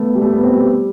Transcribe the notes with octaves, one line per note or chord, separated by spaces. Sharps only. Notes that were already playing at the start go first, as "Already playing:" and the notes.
Already playing: A3 B3
G3
A3
B3
C4
G3